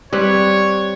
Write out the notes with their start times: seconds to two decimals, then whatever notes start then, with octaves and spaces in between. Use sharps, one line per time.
0.13 G3 C4 B4 C#5